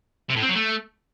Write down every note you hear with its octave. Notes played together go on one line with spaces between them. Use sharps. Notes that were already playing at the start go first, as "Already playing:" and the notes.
C3
A2
C4
F#3
A3